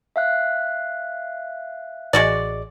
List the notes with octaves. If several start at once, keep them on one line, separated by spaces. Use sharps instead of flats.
E5 F5 F#6
A1 G#3 F#4 D5